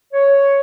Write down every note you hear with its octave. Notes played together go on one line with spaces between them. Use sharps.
C#5